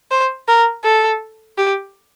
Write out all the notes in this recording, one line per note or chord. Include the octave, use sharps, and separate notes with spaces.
C5
A#4
A4
G4